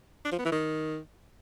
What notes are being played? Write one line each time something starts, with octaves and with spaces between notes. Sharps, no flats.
D4
F3
B3
E3
D#3